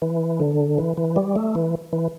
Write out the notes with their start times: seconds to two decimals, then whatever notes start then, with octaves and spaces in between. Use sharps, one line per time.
0.02 E3
0.40 D3
0.78 E3
0.97 E3
1.16 G3
1.36 A3
1.55 E3
1.93 E3